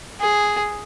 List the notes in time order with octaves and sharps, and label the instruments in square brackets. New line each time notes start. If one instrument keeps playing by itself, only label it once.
[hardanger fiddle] G#4